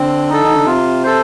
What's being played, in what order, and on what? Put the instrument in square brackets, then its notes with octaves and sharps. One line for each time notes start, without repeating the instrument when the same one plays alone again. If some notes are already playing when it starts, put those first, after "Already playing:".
Already playing: [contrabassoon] D3 [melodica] C4
[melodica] D#4 A4
[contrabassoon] D#3
D3
[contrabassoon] C3 [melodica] F4
[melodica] A4 C5